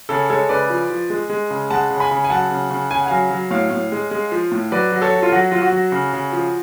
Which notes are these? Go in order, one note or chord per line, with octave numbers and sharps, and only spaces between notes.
C#3 A4 C#5
G#3 A4 C#5
C#3 B4 D5
F3
F3
G#3
G#3
C#3
G#3 F#5 A5
C#3
G#5 B5
C#3
G#5
F#3 F#5 A5
C#3
C#3
C#3 G#5
F#5
F#3 F5 G#5
F#3
A2 C#5 F5
A2
G#3
G#3
F3
A2
F#3 B4 D5
F#3
A4 C#5
F#3
F4
F#3 F#4
F#3 F4
F#4
F#3
C#3
C#3
F3